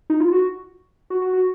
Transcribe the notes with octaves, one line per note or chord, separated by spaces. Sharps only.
D#4
F4
F#4
F#4
F#4
F#4